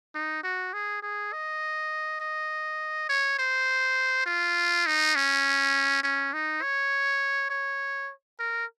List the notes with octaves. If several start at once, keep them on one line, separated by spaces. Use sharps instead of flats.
D#4
F#4
G#4
G#4
D#5
D#5
C#5
C5
F4
D#4
C#4
C#4
D#4
C#5
C#5
A#4